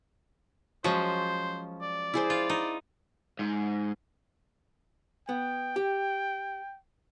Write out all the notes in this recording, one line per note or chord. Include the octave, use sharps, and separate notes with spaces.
F3 F#3 G#3 C#4 C5
D5
E4 G#4 C5
F4
D#4
G#2
B3 G5
G4